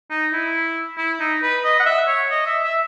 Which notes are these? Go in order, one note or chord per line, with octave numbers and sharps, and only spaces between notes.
D#4
E4
E4
D#4
B4
D#5
F#5
E5
C#5
D#5
E5
E5